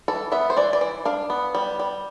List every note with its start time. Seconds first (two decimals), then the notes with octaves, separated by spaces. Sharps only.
0.08 E3 A4
0.32 B3 E5
0.50 C5
0.56 E3 D5
0.73 D5
0.81 E3
1.05 D4 F5
1.30 B3
1.55 G3
1.79 G3